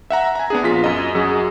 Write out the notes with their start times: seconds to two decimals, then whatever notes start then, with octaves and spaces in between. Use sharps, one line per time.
0.10 E5 F#5 A#5
0.35 G#5 A#5
0.50 B3 D4 G#4
0.63 A#1 F4 B6
0.84 F#2 D#5
1.15 F#2 F#3 G#4